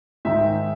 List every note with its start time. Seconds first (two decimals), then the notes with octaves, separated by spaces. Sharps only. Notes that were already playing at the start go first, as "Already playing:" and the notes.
0.25 G#2 D#3 G#3 E5